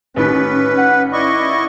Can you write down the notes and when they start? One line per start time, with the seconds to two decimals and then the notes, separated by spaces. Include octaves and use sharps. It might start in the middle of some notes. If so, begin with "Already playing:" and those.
0.16 A1 D#3 C#4 B4 B6
0.78 F#5
1.13 E4 D5 D#5 C#6